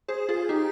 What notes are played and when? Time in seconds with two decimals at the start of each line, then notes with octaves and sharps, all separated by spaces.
0.08 G#4 C5
0.29 F4 G#4
0.49 D#4 G4